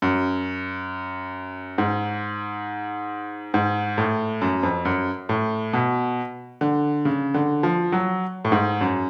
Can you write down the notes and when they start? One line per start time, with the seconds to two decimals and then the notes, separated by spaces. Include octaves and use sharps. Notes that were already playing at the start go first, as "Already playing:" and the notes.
0.02 F#2
1.78 G#2
3.54 G#2
3.98 A2
4.41 F#2
4.63 F2
4.85 F#2
5.29 A2
5.73 B2
6.61 D3
7.05 C#3
7.34 D3
7.63 F3
7.92 F#3
8.45 A2
8.52 G#2
8.81 F#2